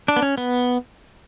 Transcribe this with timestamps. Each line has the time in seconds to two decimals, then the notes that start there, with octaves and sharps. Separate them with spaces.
0.08 D4
0.16 B3
0.22 C#4
0.38 B3